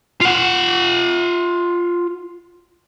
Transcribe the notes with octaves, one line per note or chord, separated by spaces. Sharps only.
F4 F#5